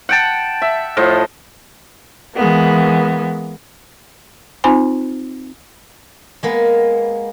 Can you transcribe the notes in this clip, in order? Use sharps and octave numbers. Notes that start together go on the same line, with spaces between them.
F#5 G5 A5
E5
A2 F3 D#5
E3 G#3 A#3 B3
C4 D#4 F4 C5 G#5 B5
G#3 A#3 B3